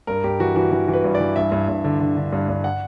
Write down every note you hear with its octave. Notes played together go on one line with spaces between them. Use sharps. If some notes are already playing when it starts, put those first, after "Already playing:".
G2 A#4
G2 G4
E3 F#4
E3 F#4
E3
E3
B4
G2
D5
E3
G2 E5
G2
G2
D3
D3
D3
G2
G2
F#5